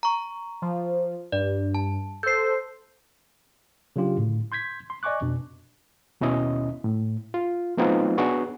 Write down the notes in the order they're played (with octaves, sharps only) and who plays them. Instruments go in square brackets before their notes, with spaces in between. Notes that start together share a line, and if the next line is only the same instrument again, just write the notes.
[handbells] A#5 C#6
[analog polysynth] F3
[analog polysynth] G2 [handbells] D5
[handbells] A5
[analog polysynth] A4 C5 [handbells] G6 C7
[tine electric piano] C#3 F#3 D4 F4 G4
A2 D3
C6 G6 G#6 B6
C6
D5 D#5 G#5 C#6 D6 F#6
F2 B2 D4
[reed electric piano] D#2 B2 C#4 E4 D#5
A2
F4
F#3 A3 B3 C4 D#4 F4
B3 D4 F#4 G#4 C#5